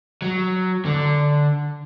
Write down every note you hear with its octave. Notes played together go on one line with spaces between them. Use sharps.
F#3
D3